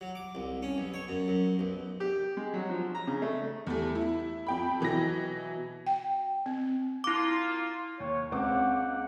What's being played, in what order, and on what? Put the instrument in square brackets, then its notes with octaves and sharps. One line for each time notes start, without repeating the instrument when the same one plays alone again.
[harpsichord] F#3
D6
C2
C#4
B1
C#5
F#2
F#2
B1
[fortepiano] G4
G#3
F#3
F3
A#5
C#3
A3
[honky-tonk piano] E2 G3 A3
E4
F2 G5 B5
B2 E3 F#3 A#6
[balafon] G5
C4
[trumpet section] A#3 F4 [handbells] E4 D6
[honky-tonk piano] D#2 [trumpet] C#5
[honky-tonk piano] C#2 C4 D6 [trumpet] F#5